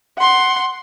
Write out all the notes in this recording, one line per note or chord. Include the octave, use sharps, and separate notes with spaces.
F#5 C6